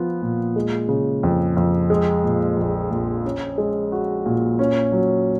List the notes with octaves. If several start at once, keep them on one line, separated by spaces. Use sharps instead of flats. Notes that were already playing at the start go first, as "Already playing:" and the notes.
Already playing: F3 B3 F4
A#2
G#3
C#3
F2
F2
G#3
A#2
A#1
A#1
C#4
G#3
F#4
A#2
C#4
F#3